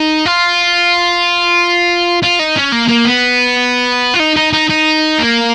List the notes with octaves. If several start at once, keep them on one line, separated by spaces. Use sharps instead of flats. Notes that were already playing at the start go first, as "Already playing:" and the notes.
Already playing: D#4
F4
F4
D#4
C#4
A#3
A#3
B3
F4
D#4
D#4
D#4
D#4
A#3